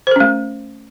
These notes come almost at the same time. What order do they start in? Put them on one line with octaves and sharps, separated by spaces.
C5 A#4 C#4 A3